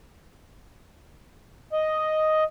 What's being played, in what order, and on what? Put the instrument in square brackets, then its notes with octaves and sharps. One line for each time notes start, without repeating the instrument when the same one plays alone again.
[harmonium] D#5